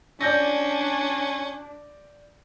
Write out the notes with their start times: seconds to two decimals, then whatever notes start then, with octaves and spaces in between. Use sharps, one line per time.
0.21 C#4 D4 D5 G6 A#6